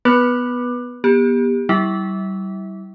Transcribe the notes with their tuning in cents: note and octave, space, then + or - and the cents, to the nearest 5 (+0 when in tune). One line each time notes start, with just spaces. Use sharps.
B3 +0 B4 -15 D6 +25
B3 -35 G4 +25
G3 -30 E4 -15 E5 -20